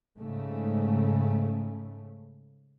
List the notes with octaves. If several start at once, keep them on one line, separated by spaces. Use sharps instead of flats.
G#2 C#3 A3